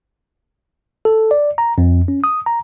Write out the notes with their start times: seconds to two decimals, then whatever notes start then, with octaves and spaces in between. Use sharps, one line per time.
1.05 A4
1.31 D5
1.58 A#5
1.78 F2
2.08 C#4
2.24 D#6
2.46 A#5